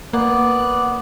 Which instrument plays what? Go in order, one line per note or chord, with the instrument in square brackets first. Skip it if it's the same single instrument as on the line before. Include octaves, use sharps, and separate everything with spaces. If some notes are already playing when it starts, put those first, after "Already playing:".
[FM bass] A#3 [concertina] B3 D5 F#6